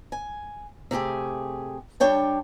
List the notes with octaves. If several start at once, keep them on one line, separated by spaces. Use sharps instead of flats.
G#5
C3 A3 G4 G#4
G3 D4 C#5 G5 A5